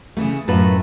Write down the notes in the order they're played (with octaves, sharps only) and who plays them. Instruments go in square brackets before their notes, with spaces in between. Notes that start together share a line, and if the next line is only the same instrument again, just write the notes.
[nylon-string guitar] C#3 E3 A3
F#2 A2 A3 F4 B4